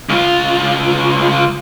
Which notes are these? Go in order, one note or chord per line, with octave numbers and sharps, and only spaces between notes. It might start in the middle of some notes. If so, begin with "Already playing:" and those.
C#2 F4